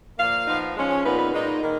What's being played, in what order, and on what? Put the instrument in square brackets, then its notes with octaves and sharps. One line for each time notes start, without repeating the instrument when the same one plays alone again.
[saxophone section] A#2 F3 A#3 F5
F3 B3 D#4
F3 G#3 C#4
C#5
A#2 F3 B3 D#4 B4
B4
A#2 G#3 D#4
D#3 A#3